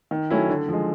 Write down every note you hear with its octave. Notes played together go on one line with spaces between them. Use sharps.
D#3
F#3 A3 C#4 E4
D3
F3 G#3